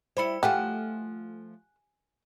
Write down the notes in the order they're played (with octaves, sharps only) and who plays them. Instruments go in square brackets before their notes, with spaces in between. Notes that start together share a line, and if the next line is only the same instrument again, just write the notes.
[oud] G3 E4 [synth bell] C5 B5 C#7
[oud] F3 A3 F4 [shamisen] G4 [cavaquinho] F#5 [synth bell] G#5